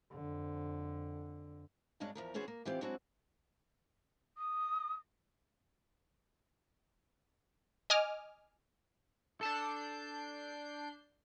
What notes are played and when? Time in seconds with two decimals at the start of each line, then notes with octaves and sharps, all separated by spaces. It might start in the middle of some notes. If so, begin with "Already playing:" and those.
0.12 F2 D3
2.00 G2 F#3 G#3 C#4 D4
2.15 E2 F3 A#4
2.34 E3 B3 C#4 F#4 G#4 C5
2.48 A#3
2.65 E3 B3 C4 F4 G4
2.81 F#3 G#3 C4 D4 E4 F#4
4.37 D#6
7.90 D#5 G#5 D6 D#6 F6
9.41 D4 A4 A5 G6 C7